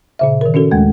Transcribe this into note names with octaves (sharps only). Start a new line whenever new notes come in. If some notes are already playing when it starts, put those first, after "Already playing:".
A#2 C#3 E5
D#3 A#4
C#4 D4 F#4 A4
D#2 G#3 A3